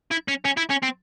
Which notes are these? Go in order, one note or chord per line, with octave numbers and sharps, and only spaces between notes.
E4
C#4
C#4
E4
C#4
C4